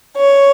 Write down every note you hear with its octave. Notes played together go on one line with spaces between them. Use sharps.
C#5